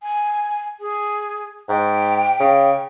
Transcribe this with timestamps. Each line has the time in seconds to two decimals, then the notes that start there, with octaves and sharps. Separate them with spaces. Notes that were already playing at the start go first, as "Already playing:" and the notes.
0.03 G#5
0.80 G#4
1.69 G#2 G5
2.40 C#3